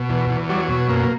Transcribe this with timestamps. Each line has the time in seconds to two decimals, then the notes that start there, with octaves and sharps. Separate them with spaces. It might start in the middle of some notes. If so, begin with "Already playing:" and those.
Already playing: B2
0.09 E2
0.30 E2
0.49 F#3 G3
0.69 B2
0.89 F#2 A#3